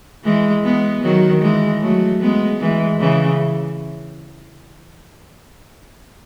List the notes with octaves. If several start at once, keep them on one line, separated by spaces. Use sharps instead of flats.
E3 G#3
G#3 B3
D#3 F#3
E3 G#3
F#3 A3
G#3 B3
E3 G#3
C#3 E3